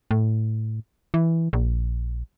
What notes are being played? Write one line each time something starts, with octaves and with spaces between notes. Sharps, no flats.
A2
E3
A#1